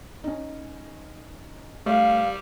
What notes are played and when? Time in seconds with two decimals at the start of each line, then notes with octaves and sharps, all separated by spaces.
0.24 C#4 D#4
1.86 G3 A3 F5